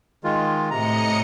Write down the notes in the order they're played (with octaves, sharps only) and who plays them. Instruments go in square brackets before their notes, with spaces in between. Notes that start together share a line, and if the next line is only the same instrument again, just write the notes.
[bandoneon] D#3 G#3 F4
[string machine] A2 D#5 C#7 [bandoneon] C3 A#5